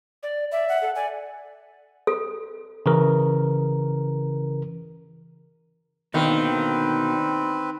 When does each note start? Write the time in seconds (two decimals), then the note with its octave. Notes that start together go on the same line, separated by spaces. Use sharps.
0.23 D5
0.52 D5 E5
0.69 F#5
0.82 A4
0.95 D5 G#5
2.07 A4
2.86 C#3 E3 A#4
6.14 B2 D3 D#3 A#3 C4 B4